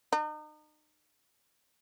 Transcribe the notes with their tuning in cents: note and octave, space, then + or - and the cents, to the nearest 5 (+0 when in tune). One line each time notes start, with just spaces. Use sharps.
D#4 -35